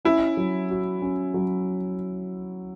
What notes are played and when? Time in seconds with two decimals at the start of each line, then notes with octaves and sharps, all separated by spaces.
0.05 C#4 E4
0.37 F#3
0.70 F#4
1.02 C#4
1.34 F#3